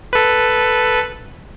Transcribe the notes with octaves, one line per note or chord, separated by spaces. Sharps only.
A4 B4